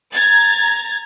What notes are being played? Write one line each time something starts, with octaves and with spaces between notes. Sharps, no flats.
A#5 G#6 A6